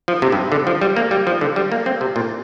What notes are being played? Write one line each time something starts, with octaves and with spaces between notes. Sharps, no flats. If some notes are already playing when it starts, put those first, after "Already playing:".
F3
C3
G2
D3
F3
G3
A#3
G3
F3
D3
G3
A#3
C4
C3
A#2